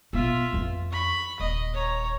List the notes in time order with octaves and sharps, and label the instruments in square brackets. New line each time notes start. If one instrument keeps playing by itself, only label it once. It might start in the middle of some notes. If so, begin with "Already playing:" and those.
[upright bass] B2 B3 [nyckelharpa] F4 E5
[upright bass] F2 E3
[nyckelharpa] B5 C#6
[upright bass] D#1 [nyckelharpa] D#5
[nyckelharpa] C#5 A#5